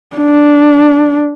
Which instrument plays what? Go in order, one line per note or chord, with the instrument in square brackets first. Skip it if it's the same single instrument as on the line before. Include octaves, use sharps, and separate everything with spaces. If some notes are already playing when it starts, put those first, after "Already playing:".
[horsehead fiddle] D4